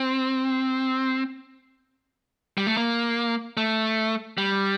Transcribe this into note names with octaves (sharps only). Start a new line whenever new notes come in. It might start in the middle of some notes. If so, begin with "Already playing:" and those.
Already playing: C4
G3
A3
A#3
A3
G3